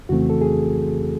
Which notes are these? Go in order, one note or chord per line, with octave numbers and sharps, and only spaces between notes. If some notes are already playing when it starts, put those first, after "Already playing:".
F2 C#3 E3 A3 C4 F#4
A4
G#4